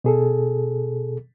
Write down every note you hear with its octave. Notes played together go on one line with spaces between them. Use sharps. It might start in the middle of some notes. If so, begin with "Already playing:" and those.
B2 G#4 A4